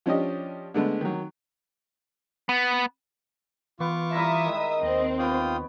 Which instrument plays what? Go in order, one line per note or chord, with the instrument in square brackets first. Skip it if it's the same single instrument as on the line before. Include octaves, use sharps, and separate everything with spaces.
[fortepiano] F3 C#4 D4 G4 D#5
D3 G#3 A3 B3
D#3 F#3
[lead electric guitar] B3
[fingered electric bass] E3 [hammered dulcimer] B3 [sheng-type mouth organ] F4 C#6 D6
[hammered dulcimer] G3 E4 A#5 [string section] E5 D#6
[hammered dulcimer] D#3 G#3
[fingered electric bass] D#2 [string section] C4 [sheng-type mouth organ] D#5
[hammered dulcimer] B3 G4 C#5 [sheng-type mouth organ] F4 G5 D#6